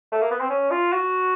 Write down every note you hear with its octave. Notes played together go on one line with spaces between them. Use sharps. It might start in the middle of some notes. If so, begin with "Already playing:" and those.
A3
A#3
B3
C4
C#4
F4
F#4